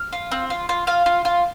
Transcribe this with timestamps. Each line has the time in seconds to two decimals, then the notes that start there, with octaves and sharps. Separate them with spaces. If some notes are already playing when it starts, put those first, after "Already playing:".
Already playing: F6
0.13 F4
0.31 C4
0.50 F4
0.69 F4
0.87 F4 F5
1.06 F4
1.25 F4